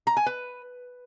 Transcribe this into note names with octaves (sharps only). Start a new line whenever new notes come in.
A#5
G#5
B4